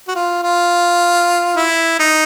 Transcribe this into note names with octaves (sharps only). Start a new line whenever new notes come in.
F#4
F4
F4
E4
D#4